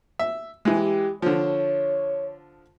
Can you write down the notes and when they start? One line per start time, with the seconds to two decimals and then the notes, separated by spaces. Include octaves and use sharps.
0.19 E5
0.65 E3 G#3 G4
1.22 D3 F3 C#5